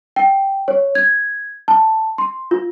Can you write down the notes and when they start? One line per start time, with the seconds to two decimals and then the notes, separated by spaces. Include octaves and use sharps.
0.16 G5
0.68 C#5
0.95 G#6
1.68 A5
2.18 C6
2.51 F4